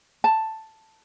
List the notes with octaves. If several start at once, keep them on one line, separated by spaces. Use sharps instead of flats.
A5